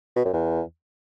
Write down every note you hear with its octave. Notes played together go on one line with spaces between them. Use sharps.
B2
F#2
E2